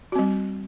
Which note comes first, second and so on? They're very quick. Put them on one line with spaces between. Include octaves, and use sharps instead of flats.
F#4 C4 G3